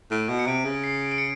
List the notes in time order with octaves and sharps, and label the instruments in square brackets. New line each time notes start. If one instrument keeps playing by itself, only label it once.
[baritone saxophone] A2 [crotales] D7
[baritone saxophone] B2
[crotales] C#7
[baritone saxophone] C3 [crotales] D7
[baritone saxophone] C#3
[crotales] C7
D7
C#7